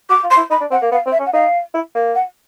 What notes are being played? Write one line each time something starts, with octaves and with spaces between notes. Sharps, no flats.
F#4 D6
F4
C6
E4
D#4 B5
D4
C4 F#5
A#3
B3 F5
C4
E5
C#4
F#5
D#4 F5
E4
A#3
F#5